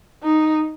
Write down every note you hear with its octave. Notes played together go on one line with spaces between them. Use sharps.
D#4